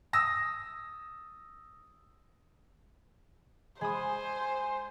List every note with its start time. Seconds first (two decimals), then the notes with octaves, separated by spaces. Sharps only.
0.13 D#6 E6 A#6
3.81 G#3 C5 G#5 B5 D#6